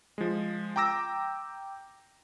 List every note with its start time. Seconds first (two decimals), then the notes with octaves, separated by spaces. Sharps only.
0.18 F3 G#3
0.76 G5 A#5 D6 E6 A#6